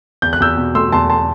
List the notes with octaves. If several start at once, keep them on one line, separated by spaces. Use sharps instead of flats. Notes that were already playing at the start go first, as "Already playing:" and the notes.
E2 G6
F#6
E2 E6 G6
B2
A3 C6 E6
E2 A5 C6
A5 C6